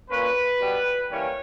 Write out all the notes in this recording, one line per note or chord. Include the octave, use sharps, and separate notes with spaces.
A#2 A#3 C#4 B4
B2 G3 B3
E3 G3 A#3 C#4 C#5